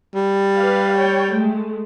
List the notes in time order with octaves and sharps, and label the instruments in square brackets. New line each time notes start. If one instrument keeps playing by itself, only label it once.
[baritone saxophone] G3
[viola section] G4 B4 F5
C#5 G5
G#3 A3